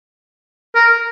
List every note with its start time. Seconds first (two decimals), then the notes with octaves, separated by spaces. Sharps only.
0.75 A#4